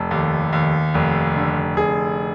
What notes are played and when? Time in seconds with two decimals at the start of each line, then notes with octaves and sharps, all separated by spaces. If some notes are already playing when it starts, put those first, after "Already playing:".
Already playing: F1 A4
0.11 D#2
0.53 D#2
0.95 F1
1.36 D3
1.76 F1 G#4